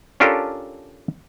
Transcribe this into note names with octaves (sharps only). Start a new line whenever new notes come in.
C#4 D4 F4 G4 A4 A#4